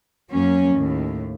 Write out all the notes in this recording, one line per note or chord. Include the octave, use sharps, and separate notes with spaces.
F#2 F#3 A#3 C#4
D#2 A2